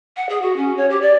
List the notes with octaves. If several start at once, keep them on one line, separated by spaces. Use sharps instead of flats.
F#5
G#4
F#4
C#4
C#5
G4
D5